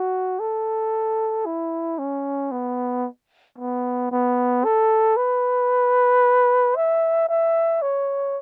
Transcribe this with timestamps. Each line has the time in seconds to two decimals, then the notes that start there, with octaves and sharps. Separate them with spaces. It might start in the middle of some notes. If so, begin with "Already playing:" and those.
Already playing: F#4
0.40 A4
1.46 E4
1.99 C#4
2.52 B3
3.58 B3
4.11 B3
4.64 A4
5.17 B4
6.76 E5
7.29 E5
7.82 C#5